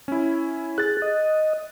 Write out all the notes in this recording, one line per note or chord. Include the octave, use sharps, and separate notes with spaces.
C#4 E4
G#4 F#6 A6
D#5